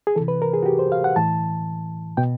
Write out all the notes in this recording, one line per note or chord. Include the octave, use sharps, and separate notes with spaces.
G#4
C3 E3 A4
B4
A#4
G#4
F#4
G4
C5
F5
F#5
A2 E3 A5
B2 G5